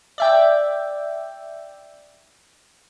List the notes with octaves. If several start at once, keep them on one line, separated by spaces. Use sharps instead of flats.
D5 E5 G5